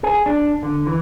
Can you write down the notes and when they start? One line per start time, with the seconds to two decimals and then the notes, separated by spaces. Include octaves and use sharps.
0.03 G#4
0.26 D4
0.63 D3
0.87 E3